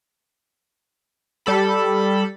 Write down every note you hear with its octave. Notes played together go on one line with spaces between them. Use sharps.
G3 A4 B5